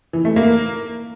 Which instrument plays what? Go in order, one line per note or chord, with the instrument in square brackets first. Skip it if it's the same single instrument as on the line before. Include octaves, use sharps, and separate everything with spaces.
[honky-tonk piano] E3
A3
A#3